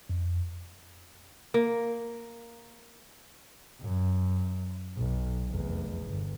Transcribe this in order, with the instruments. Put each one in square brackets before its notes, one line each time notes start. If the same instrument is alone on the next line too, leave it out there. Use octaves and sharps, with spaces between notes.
[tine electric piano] F2
[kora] A#3
[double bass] F#2
B1
F1 E2
G1